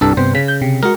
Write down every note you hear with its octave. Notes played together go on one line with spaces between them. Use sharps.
C2 G2 D4 A4
G2 C3 B3 C5
C#3 B6
G6
C3
G#3 F#4 A#4